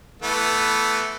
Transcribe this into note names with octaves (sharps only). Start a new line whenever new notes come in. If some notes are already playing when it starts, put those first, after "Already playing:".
E3 A3 B3